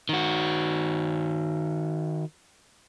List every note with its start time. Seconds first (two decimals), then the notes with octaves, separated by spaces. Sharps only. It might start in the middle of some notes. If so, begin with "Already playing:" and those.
0.09 D#3 F#4